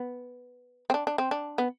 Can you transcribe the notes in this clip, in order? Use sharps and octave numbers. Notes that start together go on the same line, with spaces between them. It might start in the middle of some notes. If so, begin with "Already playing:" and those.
Already playing: B3
C4
D4
D4
C4
D4
B3